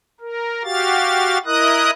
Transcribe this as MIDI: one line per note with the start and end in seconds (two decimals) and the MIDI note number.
0.20 0.63 70
0.64 1.38 66
0.64 1.38 67
0.64 1.38 77
0.64 1.38 93
1.45 1.91 64
1.45 1.91 70
1.45 1.91 75
1.45 1.91 87
1.45 1.91 90